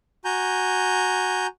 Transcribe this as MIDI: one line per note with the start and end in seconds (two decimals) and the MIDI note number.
0.25 1.47 66
0.25 1.47 80
0.25 1.47 82
0.25 1.47 91